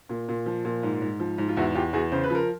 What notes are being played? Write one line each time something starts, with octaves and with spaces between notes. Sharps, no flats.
A#2
A#2
F3
A#2
G#2
G#2
F3
G#2
F4
E2 E4 F#4
E2 F4 G4
E2 F#4 G#4
C#3 C5
B4
F3 A#4